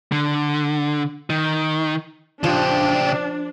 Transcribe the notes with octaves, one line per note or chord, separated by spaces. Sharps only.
D3
D#3
C#3 F3 D4 G4